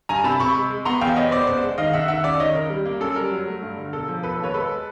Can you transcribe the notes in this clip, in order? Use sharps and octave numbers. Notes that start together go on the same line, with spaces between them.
G2 G#5 A#5
C3 A5 B5
C3 B5 C#6
G#3
G#3
B3 A#5 C6
E2 F5 G5
B3 C#5 D#5
B3 C5 D5
F#1 C5 D5
G#3
D#3 D#5 F5
F#1 E5 F#5
D#3 E5 F#5
C#2 D5 E5
D#3 C#5 D#5
C#2 A#4
G3
A#3
F#2 A4
G3 A#4
F#3
A3
G2
D3
E1 A4
F3
E1 A4 B4
D#2
B4 C#5
G#3 A4 B4
G#3